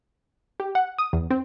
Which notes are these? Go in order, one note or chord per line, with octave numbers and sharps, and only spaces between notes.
G4
F#5
D#6
E2
C4